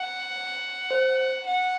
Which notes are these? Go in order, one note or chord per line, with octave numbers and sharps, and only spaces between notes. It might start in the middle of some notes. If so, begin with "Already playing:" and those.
Already playing: F#5
C5
F#5